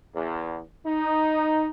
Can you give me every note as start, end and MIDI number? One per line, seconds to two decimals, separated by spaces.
0.13 0.60 40
0.86 1.70 63